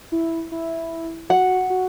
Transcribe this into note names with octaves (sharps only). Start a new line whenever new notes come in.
E4
E4
F#4 F#5
F#4